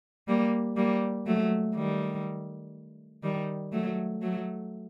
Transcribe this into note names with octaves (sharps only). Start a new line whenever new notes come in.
G3 A#3
G3 A#3
F#3 A3
D#3 G3
D#3 G3
F#3 A3
F#3 A3